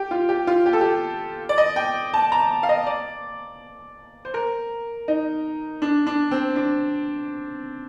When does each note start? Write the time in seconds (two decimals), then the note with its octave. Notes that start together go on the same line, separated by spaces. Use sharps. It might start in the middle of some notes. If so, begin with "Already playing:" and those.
Already playing: G4
0.11 F4
0.29 G4
0.47 F4
0.66 G4
0.73 A4
0.81 G4
1.49 D5
1.58 D#5
1.76 G5
2.14 A5
2.32 A#5
2.63 F5
2.69 D#5
2.87 D5
4.25 C5
4.34 A#4
5.08 D#4
5.82 D4
6.07 D4
6.31 C4
6.56 D4